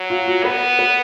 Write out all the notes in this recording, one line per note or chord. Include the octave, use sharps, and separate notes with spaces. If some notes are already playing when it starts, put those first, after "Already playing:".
Already playing: F#3
F4
F#4
B3 B4
B4